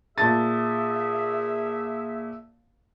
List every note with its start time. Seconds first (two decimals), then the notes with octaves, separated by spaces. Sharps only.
0.18 A#2 G#4 E5 A5 A6